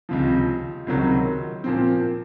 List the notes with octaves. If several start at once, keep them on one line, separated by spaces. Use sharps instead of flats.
C#2 C3 F3
C#2 C3 D#3 F#3
A#2 F3 C4